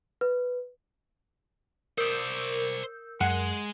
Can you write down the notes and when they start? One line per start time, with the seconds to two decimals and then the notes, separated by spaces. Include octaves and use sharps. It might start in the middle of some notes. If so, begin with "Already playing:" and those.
0.21 B4
1.98 A#4 C5 D5 E6 G6
3.21 F#2 G#3 F#5